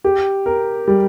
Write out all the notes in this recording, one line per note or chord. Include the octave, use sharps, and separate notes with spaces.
G4
A#4
G3